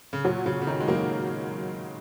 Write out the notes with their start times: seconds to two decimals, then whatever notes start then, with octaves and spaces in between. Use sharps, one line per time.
0.13 C#3
0.25 A#2 F#3
0.46 C#3 F#3
0.62 C#3
0.67 D#3 D#4
0.80 G#3
0.88 F#3 A#3